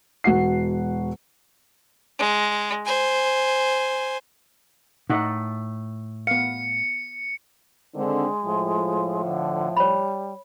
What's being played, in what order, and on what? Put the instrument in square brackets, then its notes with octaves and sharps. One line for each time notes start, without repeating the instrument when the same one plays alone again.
[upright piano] E1 F#4 F#5 C7
[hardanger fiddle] G#3
C5 G#5
[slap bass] A2 [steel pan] D#4 F#5
[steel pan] B3 F5 [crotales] C#7
[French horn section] D3 D#3 C4 [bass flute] G#3
[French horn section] A2 F3
[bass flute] D3
[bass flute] G3 [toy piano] C#5 B5